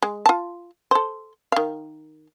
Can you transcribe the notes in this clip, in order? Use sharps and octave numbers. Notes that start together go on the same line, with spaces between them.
G#3
F4 A5
A4 C5
D#3 F5